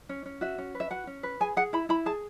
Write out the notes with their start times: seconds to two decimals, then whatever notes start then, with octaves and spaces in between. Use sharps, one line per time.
0.09 C#4
0.26 C#4
0.41 F#4 E5
0.58 C#4
0.75 B4
0.80 E5
0.91 F#4 F#5
1.07 C#4
1.23 B4
1.40 G#4 G#5
1.57 G#4 F#5
1.73 E4 B5
1.89 E4 B5
2.06 G#4 A5